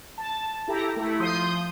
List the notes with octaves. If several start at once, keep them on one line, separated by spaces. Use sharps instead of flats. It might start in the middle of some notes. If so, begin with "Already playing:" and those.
A5
E4 G4 A4 A#5
A3 E4
F3 C6 D#6 G6